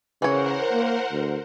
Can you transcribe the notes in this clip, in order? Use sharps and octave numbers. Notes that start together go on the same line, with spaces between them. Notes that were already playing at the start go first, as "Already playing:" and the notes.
C#3 E3 A#4 C5 C#5 F#5
A#3
D2